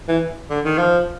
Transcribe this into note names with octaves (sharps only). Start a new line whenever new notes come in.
E3
D3
D#3
F3